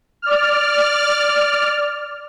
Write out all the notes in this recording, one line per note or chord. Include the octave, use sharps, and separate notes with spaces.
D5 F6